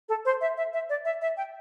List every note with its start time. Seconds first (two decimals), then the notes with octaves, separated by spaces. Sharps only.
0.09 A4
0.25 C5
0.41 E5
0.57 E5
0.73 E5
0.89 D5
1.05 E5
1.22 E5
1.37 G5